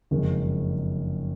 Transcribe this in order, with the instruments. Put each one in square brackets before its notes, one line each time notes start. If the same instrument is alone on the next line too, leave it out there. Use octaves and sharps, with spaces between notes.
[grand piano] F#1 F2 D#3 G#3